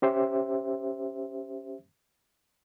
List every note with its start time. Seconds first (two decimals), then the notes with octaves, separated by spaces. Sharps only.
0.02 C#4 G4 C5 E5